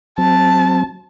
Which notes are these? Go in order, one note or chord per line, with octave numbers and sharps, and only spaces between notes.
F#3 C4 A5